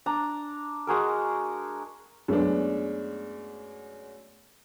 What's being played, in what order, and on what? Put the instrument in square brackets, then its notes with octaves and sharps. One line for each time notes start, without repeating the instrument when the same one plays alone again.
[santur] D4 A#5
G#3 F#4 G#4 A#4
[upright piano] F#2 G#3 A3 B3 D4